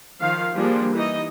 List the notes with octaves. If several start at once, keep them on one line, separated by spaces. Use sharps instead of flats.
D#3 F3 F5
F3 G3 A#3 D4 G#4
E3 D#4 D#5